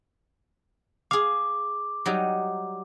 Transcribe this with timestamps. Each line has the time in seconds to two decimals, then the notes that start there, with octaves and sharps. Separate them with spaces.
1.11 G#4 F5 D6
2.06 F#3 G3 D#4